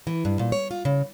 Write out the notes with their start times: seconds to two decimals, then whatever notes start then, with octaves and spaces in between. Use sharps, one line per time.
0.07 E3
0.25 G2
0.39 A#2
0.52 C#5
0.71 F4
0.85 C#3